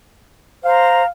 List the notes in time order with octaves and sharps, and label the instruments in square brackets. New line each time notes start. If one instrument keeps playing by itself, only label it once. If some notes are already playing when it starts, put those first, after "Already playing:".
[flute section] C5 A#5 [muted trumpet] F5